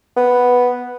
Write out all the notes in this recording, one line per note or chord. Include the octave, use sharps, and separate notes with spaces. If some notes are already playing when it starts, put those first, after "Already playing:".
B3